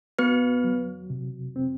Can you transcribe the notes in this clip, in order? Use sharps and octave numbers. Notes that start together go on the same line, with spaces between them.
B3 F#4 B4
F#3
C3
C4